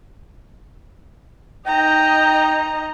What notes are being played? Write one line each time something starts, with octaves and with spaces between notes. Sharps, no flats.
D#4 D#5 G5 A#5